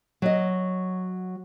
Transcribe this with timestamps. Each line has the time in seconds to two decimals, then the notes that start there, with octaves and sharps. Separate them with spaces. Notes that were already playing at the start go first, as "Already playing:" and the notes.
0.22 F#3 D#5